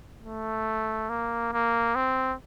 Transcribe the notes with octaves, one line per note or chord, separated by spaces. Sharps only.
A3
A#3
A#3
C4